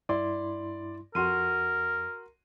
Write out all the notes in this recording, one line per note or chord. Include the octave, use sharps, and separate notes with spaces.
G2 E4 D5 C6
F2 F#4 A#4 C6 D#7